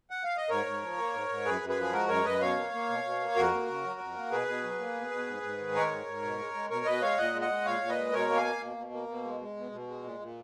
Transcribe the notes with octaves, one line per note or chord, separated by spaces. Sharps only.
F#5
F5
D#5
G#2 A#4 C#5
G#2
F3
A#3
G#2
G#2
F#2 G#4 B4
F#2
G#4 B4
F3
G#4
G#3 F#4 A#4
F#2 A#4 C#5
F#2 B4 D#5
B2 C#5 F5
A#3
A#3
B2
B2
A#3
F2 F#4 A#4
A#3
C#3
F#3
F2
A#3
B2 G#4 B4
B2
F#3
A#3
B2
B2
G#2
G#2
D#3
G#3 A#4 C#5
G#2
G#2
B2
G#3
G#3
B2 A#4 C#5
B2 B4 D#5
G#3 C#5 F5
A#2 D#5 F#5
G#3
D#5 F#5
G#3
A#2 C#5 F5
A#2
B4 D#5
G#3
B2 A#4 C#5
A#3
F5 G#5
A#3
B2
B2
A#3
B2
G#3
G#3
B2
B2
G#3
A#2
A#2